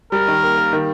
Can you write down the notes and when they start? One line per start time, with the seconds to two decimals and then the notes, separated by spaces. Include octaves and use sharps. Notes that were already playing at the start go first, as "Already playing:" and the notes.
0.12 G3 A#4
0.28 D#3
0.43 A#3
0.57 A#3
0.73 D#3